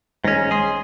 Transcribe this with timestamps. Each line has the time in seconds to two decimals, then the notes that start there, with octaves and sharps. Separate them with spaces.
0.24 G#1 G#2 C#4 A#6
0.51 G#3 G#4 C6